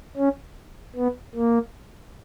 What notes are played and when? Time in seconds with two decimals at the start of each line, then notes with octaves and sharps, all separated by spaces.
0.17 C#4
0.95 B3
1.35 A#3